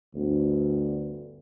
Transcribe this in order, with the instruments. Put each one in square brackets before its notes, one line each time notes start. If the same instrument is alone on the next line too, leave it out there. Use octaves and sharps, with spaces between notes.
[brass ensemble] G1 D2